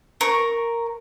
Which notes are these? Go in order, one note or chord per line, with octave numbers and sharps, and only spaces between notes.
A#4 C#6